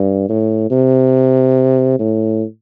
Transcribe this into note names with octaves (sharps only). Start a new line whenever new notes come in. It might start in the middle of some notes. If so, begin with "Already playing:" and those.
Already playing: G2
A2
C3
A2